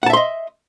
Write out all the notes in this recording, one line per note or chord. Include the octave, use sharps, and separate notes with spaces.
D#5 E5 F#5 A5 C6